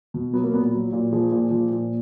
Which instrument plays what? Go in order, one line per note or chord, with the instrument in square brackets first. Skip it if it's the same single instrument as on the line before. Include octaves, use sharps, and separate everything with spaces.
[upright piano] B2
F#3 B3
A#3
A#2 B3
F#3
A#2
F3 G#4
A#2
F3
A#2